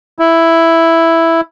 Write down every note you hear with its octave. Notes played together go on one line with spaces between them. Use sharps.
E4